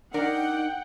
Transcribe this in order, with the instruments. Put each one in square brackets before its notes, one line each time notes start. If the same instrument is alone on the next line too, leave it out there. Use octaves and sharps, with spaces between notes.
[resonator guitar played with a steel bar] D4 A#4 D5 [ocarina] D#4 [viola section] F#5 G5